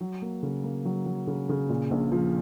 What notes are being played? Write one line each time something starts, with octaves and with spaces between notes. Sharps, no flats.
F#3
A#3
C#3
A#3
F#3
F#3
C#3
C#3
A#2
A#1
F3